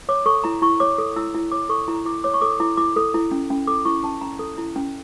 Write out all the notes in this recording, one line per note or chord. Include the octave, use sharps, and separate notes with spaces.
C#5 D6
A4 C#6
E4 A#5
E4 C#6
C#5 D6
A4
E4 E6
E4
C#5 D6
A4 C#6
E4 A#5
E4 D6
C#5 D6
C#6
A4 D6
E4 D6
E4 D6
A4
E4
C#4
C#4
A4 D6
E4 C#6
C#4 A5
C#4 A#5
A4
E4
C#4